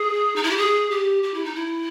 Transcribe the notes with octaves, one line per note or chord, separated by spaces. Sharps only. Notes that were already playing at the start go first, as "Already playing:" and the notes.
Already playing: G#4
D#4
E4
G4
G#4
G4
G4
E4
D#4
E4